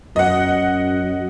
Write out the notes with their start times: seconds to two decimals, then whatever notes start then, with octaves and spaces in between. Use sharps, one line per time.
0.16 F#2 D#5 F#5